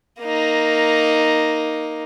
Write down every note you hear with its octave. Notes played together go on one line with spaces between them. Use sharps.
A#3 D#4